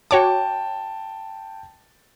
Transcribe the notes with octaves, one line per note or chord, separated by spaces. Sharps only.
F#4 C#5 G5 A5 D6